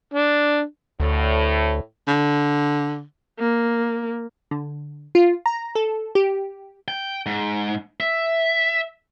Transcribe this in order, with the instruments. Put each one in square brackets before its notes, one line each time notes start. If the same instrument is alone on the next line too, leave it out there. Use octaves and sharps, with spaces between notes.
[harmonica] D4
[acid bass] D2 [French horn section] A2
[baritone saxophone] D3
[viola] A#3
[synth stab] D3
F4
A#5
A4
G4
[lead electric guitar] G5
G#2
E5